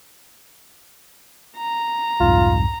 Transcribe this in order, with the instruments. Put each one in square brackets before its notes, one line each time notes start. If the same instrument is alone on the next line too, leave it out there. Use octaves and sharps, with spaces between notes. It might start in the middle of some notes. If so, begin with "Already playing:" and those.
[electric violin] A#5
[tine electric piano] C2 F2 G#2 [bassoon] F4